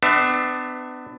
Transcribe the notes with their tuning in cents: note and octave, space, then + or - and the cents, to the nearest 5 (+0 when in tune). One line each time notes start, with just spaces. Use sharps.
B3 +35 D4 +30 E5 +0